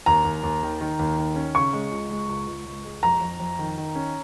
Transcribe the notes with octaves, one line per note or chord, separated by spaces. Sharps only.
D#2 A#5
D#2
D#2
D#3
D#3
D#2
D#3
C#4
C#3 C#6
G#3
C#2
G#3
C#2
C#2
C#2
G#3
F2 A#5
F2
F2
D#3
D#3
C#4